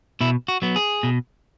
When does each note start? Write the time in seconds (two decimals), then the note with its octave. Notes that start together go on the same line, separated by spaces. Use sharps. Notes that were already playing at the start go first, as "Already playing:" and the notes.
0.21 B2 E4
0.48 F#4
0.62 F#3 B3
0.76 G#4
1.03 B2